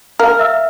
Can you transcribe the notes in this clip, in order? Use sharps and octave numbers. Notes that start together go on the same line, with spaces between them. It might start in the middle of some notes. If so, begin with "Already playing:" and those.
A#4 F5 F6
E5 E6